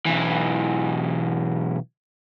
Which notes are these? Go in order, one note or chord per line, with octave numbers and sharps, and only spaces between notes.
B1 E3